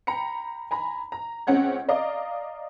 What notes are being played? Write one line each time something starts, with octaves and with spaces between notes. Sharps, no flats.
G5 A#5 B5 C#7
G#5 A#5 B5
A#5
C#2 C4 C#4 F#5 G#6
D5 D#5 F5 A#5 D6